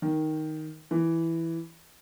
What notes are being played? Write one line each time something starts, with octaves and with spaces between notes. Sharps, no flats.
D#3
E3